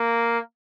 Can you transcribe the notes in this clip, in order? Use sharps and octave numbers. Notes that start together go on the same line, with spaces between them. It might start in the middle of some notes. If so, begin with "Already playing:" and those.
Already playing: A#3